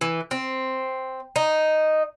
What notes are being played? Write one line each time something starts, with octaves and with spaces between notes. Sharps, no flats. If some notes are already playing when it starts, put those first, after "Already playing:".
E3
C4
D#4